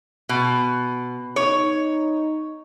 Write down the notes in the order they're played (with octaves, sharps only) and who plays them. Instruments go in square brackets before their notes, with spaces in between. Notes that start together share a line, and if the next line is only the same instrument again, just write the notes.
[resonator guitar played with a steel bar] B2
[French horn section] D#4 [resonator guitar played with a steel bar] C#5